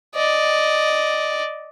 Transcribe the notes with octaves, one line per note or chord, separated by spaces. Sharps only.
D5 D#5